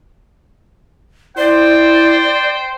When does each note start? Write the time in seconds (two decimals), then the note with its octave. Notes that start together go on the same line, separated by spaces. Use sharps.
1.38 E4 C5 D5 G5